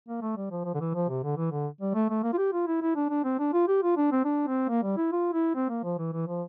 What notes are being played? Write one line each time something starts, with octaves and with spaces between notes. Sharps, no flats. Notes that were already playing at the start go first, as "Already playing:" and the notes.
A#3
A3
G3
F3
F3
D3
E3
F3
C3
D3
E3
D3
G3
A3
A3
A#3
F4
G4
F4
E4
E4
D4
D4
C4
D4
F4
G4
F4
D4
C4
D4
C4
A#3
G3
E4
F4
E4
C4
A#3
F3
E3
E3
F3